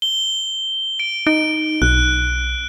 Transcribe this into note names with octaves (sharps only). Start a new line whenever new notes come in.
G7
D7
D#4 D7
B1 F#6